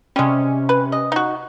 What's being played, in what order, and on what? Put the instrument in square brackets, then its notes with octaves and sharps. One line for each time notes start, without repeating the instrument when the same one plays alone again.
[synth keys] C3 C#4 [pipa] G3 G#3
[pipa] B4
D#5
D#4 F#4